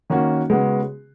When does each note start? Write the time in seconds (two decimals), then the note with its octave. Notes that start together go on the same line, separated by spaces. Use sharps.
0.10 D#3 A#3 C#4 F#4
0.50 C#3 G#3 B3 F#4